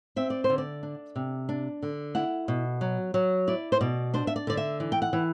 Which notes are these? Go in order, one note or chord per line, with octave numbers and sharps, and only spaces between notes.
C4 E5
D5
C5
D3
D5
D4
C3
D4
D3
E4 F#5
B2
F#3
F#3
E4 D5
C5
B2 D5
D4 C5
E5
D5
D3 D5
E5
E3
G5
F#5
E3